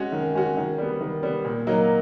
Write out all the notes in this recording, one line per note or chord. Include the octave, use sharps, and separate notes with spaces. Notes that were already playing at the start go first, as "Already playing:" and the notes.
Already playing: G#3 C#4 F#4
D#3
G#3 C#4 F#4
D#3
G3 B3
D#3
G3 B3
A#2
F#3 A#3 D#4